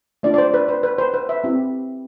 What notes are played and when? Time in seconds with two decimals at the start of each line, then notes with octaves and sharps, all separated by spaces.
0.23 A3 D4 F4 D5
0.34 D5
0.38 C5
0.54 B4
0.69 C5
0.83 B4
0.98 C5
1.14 B4
1.29 E5
1.44 C4 E4 G4